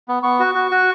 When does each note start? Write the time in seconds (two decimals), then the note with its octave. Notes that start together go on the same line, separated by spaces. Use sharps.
0.08 B3
0.23 B3 C#6
0.40 F#4
0.55 F#4
0.71 F#4